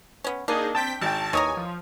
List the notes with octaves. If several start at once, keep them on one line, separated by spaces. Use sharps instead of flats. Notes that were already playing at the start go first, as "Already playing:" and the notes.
B3 C#4
A#3 D4 D#4 G#4 D#5
C4 G5 A5 B6
G#1 G5 A5
D#2 D#3 E3 C#5 G#5 A#5 D#6
F3